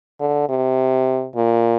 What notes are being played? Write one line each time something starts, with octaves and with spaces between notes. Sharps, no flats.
D3
C3
A#2